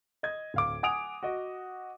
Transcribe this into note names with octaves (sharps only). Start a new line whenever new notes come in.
D#5 G#6
D1 F5 D6
F#5 G#5 D#6 D7 F7
F#4 D#5